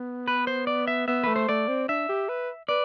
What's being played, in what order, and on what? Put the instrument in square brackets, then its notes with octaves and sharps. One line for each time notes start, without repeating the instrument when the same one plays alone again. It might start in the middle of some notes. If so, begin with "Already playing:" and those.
Already playing: [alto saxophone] B3
[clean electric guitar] B4
C5
D5
E5
[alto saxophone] B3 [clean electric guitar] E5
[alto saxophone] A3 [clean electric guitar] B4
[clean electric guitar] C5
[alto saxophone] A3 [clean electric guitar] D5
[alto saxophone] C4
[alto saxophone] D4 [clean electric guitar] E5
[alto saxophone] G4
B4
[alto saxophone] B4 [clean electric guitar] D5